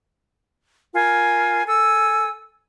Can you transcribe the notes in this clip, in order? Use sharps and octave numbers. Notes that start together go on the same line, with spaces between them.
F4 A#4 G#5
A4 G#5 E6